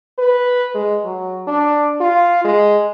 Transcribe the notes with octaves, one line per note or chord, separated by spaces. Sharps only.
B4
G#3
F#3
D4
F4
G#3